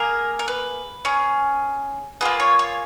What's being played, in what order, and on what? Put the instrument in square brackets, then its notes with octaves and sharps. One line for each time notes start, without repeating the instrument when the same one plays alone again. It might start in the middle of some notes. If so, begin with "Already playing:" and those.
Already playing: [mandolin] A#3 G#4 A#4
A#4
B4
C#4 G#4
A#3 F4 G#4 B4
C#5
C#5